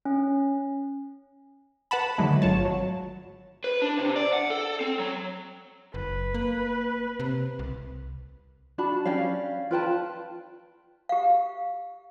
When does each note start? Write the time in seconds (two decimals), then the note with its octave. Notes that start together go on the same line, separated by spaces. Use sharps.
0.05 C#4
1.91 B4 F#5 A5 B5
2.18 D3 D#3 F#3 G#3 A3
2.42 G#1 F4 C#5 A5
2.65 F#3
3.64 B4
3.82 D4
3.99 C3
4.16 D5
4.33 F#5
4.50 A4
4.81 C4
4.99 F#3
5.94 F#1 B4
6.34 A#3
7.20 C3
7.59 C2
8.78 D4 F#4 A5 B5
9.05 C#4 G4 D5 F5
9.71 F4 B4 G5 A5
11.09 G4 F5